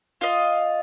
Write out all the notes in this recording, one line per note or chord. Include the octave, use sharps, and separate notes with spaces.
F4 D#5